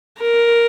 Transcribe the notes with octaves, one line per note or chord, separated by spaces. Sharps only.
A#4